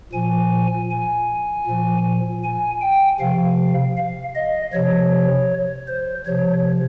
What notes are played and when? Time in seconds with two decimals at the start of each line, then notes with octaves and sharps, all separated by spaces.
0.13 A#2 F3 G#5
0.90 G#5
1.67 A#2 F3
2.43 G#5
2.81 G5
3.20 C3 F3 F5
3.97 F5
4.35 D#5
4.73 C3 F3 C#5
5.88 C5
6.26 C3 F3 C#5